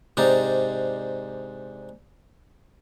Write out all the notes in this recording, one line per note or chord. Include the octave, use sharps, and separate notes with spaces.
G#2 C3 D4 D#4